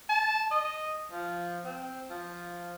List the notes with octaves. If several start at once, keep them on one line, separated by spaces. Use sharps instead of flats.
A5
D#5
F3
C4
F3